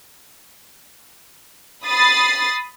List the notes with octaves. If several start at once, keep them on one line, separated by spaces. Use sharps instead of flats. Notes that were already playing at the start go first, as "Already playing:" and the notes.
B5 D#6 A6 C7